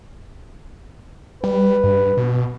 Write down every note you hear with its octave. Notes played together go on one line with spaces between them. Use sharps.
G3 B4
G2
B2